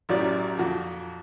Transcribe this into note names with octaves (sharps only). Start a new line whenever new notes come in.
A1 F#2 F#3 G4 D5
F2 A#2 F#4